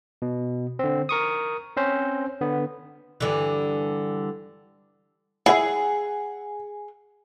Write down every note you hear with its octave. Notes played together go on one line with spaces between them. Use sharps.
B2
D3 C4
A#4 C#6 D#6
C4 C#4 C5
D3 B3
G2 D3 E3
E4 G#4 E5 F#5